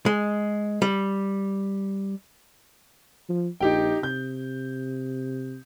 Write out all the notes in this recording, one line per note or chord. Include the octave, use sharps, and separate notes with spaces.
G#3
G3
F3
A#1 D#4 G4 G5
C3 G6